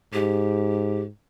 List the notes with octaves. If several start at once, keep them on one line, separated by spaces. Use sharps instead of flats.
G#2 G4